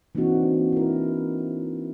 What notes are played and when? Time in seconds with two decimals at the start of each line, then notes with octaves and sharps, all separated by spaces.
0.15 E3 A#3 C4 D4 D#4 F#4
0.72 E4 A#4